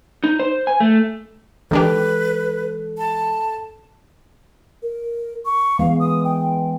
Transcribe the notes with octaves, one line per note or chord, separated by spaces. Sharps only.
D#4
C5
G#5
A3
D#3 E3 G#3 D4 G4 A4 B4
A5
A#4
C#6
E3 G#3 B3 F5
D#6
G5